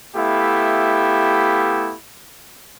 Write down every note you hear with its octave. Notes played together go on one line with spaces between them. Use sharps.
A3 B3 E4 G4 F5